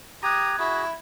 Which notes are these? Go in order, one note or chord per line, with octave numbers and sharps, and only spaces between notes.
G4 A#5 D#6 F#6 G#6 A#6
E4 F#4 G#4